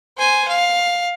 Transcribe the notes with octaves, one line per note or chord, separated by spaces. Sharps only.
C5 G#5
F5